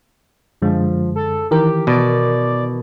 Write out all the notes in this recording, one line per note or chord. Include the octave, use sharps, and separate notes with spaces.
F#2 D3 F3 G#3
A4
D#3 E3 G4 A#4
B2 D5